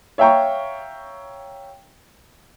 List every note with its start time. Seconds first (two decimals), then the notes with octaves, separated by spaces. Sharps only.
0.18 C#5 E5 F5 G5 A#5 C#6